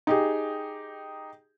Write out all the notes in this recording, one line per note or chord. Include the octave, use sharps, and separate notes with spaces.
D#4 G4 G#4